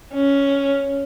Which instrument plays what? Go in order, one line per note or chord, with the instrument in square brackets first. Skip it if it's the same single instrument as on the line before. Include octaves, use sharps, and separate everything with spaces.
[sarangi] C#4